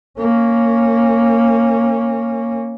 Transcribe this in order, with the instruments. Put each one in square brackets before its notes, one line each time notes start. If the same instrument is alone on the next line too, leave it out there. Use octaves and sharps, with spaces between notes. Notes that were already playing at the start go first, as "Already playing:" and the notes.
[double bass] A#3 C#4